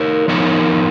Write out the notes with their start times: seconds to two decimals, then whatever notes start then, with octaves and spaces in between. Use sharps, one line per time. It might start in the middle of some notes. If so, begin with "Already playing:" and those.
Already playing: D#4 A#4 C#5
0.28 F3 B3 D#4 A#4 C#5